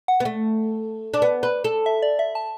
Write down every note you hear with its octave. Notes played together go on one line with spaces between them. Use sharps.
F#5
B3
A3
D4
B3
B4
A4
E5
D5
E5
A5